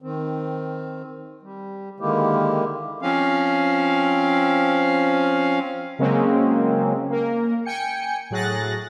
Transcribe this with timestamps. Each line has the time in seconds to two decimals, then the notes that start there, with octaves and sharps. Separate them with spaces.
0.02 D#3 C4
1.42 G3
2.00 D3 D#3 G#3 A#3 E4 G4
3.02 F3 C4 C#4 F5
5.99 C#3 F#3 G#3 A#3 C4 C#4
7.10 A#3 A#4
7.65 G5 G#5 C#7
8.30 A2 F#3 G#4 F#6 A6 A#6